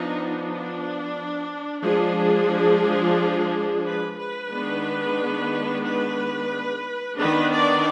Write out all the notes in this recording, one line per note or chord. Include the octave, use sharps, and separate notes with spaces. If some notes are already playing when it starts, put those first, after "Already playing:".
Already playing: F3 B3 D4 D#4
D4
F3 G#3 D4 G#4
B4
B4
D#3 G#3 B3 D4
B4
D#3 B3 D4 B4
D5